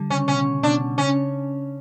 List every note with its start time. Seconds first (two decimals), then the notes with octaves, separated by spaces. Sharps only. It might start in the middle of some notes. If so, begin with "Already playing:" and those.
Already playing: D3 G3
0.10 C#3 C#4
0.28 B2 C#4
0.63 B2 D4
0.98 C#3 C#4